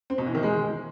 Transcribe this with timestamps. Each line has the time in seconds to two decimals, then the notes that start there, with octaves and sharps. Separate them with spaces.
0.10 C4
0.18 B2
0.26 E3
0.35 D#3
0.43 G#3